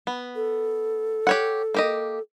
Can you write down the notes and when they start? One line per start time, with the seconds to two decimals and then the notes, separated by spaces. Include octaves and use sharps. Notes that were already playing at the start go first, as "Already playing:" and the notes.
0.07 B3
0.36 A4
1.27 G4 C#5 F#5
1.74 A#3 G4 D#5